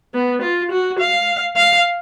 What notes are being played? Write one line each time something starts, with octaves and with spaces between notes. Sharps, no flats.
B3
F4
F#4
F5
F5